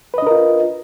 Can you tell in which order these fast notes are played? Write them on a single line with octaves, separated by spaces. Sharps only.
B4 D#5 D4 A#4 F4